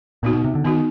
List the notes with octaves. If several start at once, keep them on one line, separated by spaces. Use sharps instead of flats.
A#2 B3 D#4 F#4
B2
C3
D3
D#3 B3 D#4 F#4